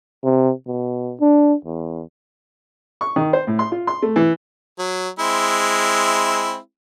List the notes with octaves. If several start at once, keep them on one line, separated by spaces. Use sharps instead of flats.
C3
B2
D4
E2
C#6
D#3
C5
A2
C6
F4
C6
A3
E3
F#3
G#3 C4 E4